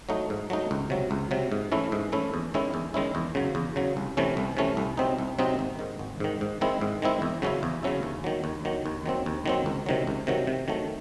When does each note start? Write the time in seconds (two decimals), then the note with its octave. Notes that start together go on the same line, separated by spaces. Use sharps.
0.09 F#3 A3 D#4
0.30 G#2
0.50 F#3 A3 D#4
0.71 C#2
0.90 C3 F#3
1.11 C#2
1.31 C3 F#3
1.52 G#2
1.72 E3 A3 C#4 E4
1.92 G#2
2.12 E3 A3 C#4 E4
2.34 E2
2.54 D#3 G#3 C#4 E4
2.74 E2
2.94 D#3 G#3 C#4 E4
3.15 E2
3.35 C#3 F#3
3.55 E2
3.76 C#3 F#3
3.97 C2
4.17 C3 E3 A3 C#4
4.37 C2
4.57 C3 E3 A3 C#4
4.77 C2
4.97 C3 F#3 C4 D#4
5.18 C2
5.39 C3 F#3 C4 D#4
5.59 G#1
5.79 G#2 D#3
5.99 G#1
6.20 G#2 D#3
6.41 G#2
6.61 D#3 G#3 C4 E4
6.81 G#2
7.02 D#3 G#3 C4 E4
7.22 E2
7.42 C#3 F#3 C#4 E4
7.63 E2
7.83 C#3 F#3 C#4 E4
8.03 D#2
8.24 D#3 F#3
8.44 D#2
8.65 D#3 F#3
8.86 D#2
9.06 D#3 F#3 C4
9.26 D#2
9.46 D#3 F#3 C4
9.66 C#2
9.86 C3 D#3 F#3
10.07 C#2
10.27 C3 D#3 F#3
10.47 C3
10.68 D#3 F#3 A3